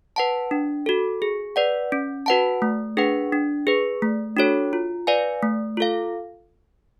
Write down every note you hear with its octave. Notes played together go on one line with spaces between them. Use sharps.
B4 F#5 A5
D4
F#4 A4
G#4
B4 D5 F#5
C#4
F#4 B4 F#5 A5
A3
D4 G#4 B4 F#5
D4
G#4 B4
A3
D4 F#4 A4 C#5
F4
B4 D5 F5 G#5
A3
F4 A4 F5